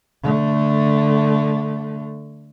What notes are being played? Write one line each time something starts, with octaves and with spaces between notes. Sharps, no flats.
D3 A3